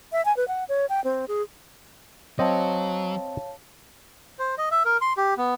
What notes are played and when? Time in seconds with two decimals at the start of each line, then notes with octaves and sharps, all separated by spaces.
0.12 E5
0.25 G#5
0.37 B4
0.48 F#5
0.69 C#5
0.89 G5
1.04 C4
1.28 G#4
2.39 F#3 C4 C#5 D#5 F5 A5
4.39 C5
4.58 D#5
4.71 E5
4.85 A#4
5.01 C6
5.17 G4
5.37 B3